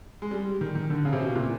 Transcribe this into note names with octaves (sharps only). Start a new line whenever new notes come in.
G#3
G3
D#3
D#3
D3
C#3
C3
B2
A#2